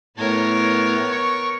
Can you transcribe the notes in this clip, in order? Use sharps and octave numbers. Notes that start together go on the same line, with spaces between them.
A2 B3 A#4 C#5
C#6